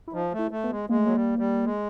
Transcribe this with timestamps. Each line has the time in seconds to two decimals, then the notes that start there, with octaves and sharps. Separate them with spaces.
0.07 E4
0.13 F3 D#4
0.33 A3
0.39 E4
0.51 A3
0.64 B3
0.71 G#3
0.89 G#3 A#3
0.98 A3
1.06 F#3 A#3
1.15 G3
1.39 G3
1.65 G#3